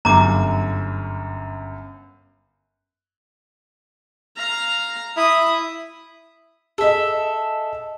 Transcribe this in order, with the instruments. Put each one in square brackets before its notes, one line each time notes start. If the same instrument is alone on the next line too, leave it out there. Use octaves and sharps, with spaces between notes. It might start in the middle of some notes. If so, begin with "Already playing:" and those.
[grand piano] G1 F#2 [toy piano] A#5 D6
[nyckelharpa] F5 A#5
[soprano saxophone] E4 [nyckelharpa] D#6
[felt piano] G#4 D#5 [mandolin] A4 E5